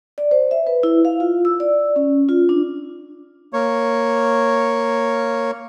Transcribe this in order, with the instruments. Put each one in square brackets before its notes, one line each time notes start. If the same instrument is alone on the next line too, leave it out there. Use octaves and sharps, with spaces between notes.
[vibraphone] D5
C5
E5
B4
E4
F5
F4
E6
D5
C#4
F4
D4
[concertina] A#3 C#5